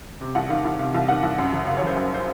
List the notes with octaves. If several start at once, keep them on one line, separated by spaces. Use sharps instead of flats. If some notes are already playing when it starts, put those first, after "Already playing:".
C3
C2 F#5
D#3 F5
C2
C3 F5
C2 F5
D#3 F#5
C2
F#2
F#1
C#3 F5
C#5
F#1 C5
F#2
C5